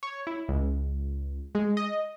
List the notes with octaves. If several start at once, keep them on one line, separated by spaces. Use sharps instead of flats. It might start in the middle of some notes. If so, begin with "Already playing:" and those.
C#5
E4
C#2
G#3
D#5